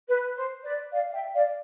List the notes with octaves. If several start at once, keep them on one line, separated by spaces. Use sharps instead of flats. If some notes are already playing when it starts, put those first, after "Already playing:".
B4
C5
B4 D5
D5 F5
F5
E5 G5
D5 F5